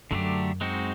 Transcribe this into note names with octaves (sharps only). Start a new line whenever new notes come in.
F#2 D3 F#3 A3 D4 G4
G#3 C4 D#4 F#4